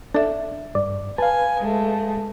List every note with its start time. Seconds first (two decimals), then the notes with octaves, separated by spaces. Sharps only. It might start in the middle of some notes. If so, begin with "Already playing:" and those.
0.14 D4 A4 E5
0.75 G2 D5
1.18 B4 F5 G#5 A5
1.60 G#3 A3